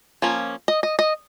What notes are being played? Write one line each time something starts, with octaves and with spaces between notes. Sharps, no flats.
F3 A#3 C#4
D#5
D#5
D#5